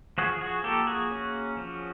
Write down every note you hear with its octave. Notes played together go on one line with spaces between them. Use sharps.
F3 F#4 G#4
F#4 G#4
A#3 G4 A4
F#4 G#4
C#4
F3